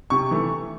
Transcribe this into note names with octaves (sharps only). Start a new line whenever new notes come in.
C3 C#6
E3 A3